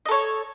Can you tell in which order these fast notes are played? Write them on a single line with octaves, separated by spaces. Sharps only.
D#5 A4 C#5